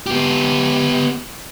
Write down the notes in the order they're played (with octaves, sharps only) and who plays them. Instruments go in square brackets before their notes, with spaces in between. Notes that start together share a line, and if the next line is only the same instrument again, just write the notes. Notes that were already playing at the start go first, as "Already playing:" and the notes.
[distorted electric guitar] B3 G4